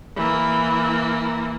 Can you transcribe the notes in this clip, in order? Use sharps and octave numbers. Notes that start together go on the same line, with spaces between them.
E3 A#3